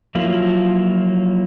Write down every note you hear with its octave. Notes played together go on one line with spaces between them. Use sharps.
F3 F#3 A#3 E4 F4